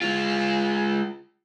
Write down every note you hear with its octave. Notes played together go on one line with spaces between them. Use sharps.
G#3 F4